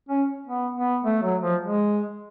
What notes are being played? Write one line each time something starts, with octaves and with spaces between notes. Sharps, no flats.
C#4
B3
B3
A3
F#3
F3
G#3